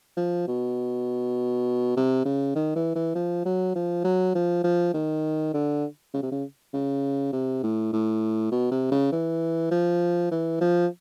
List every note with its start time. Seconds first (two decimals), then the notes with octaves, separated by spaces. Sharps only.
0.17 F3
0.47 B2
1.96 C3
2.25 C#3
2.55 D#3
2.76 E3
2.95 E3
3.15 F3
3.45 F#3
3.75 F3
4.04 F#3
4.35 F3
4.64 F3
4.94 D#3
5.54 D3
6.14 C#3
6.22 C3
6.31 C#3
6.73 C#3
7.32 C3
7.63 A2
7.93 A2
8.51 B2
8.71 C3
8.91 C#3
9.12 E3
9.71 F3
10.31 E3
10.60 F3